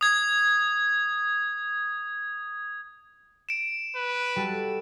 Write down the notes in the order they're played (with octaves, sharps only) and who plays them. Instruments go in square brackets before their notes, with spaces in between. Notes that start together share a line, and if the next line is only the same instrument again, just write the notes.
[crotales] D#6 G#6
D7 E7
[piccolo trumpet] B4
[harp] G3 F#4 A4